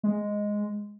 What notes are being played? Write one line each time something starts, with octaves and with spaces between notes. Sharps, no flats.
G#3